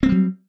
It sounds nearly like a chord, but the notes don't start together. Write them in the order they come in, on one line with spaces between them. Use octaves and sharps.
C4 A#3 G3 F#3